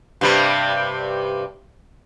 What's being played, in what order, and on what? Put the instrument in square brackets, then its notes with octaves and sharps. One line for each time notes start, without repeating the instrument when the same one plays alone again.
[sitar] G2 C3 G3